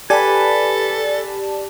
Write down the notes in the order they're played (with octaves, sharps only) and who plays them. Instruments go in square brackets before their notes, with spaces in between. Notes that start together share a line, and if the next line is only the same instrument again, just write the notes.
[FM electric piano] G4 D5 A5 [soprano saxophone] A4 [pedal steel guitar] B4 G#5